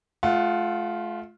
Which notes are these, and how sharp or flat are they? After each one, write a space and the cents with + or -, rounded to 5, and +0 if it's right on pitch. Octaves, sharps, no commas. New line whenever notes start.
A3 -40 F4 +0 F#5 +0